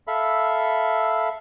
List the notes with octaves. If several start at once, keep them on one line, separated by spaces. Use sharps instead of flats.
A4 E5 F5 B5